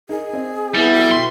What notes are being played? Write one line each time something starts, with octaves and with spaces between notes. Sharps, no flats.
D#4 G#4 A#4
C4 D#5
G3 B3 E4
F#3 A4 G5
B2 C6 B6